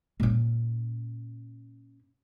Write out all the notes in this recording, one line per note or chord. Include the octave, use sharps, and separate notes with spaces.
A#2 C#4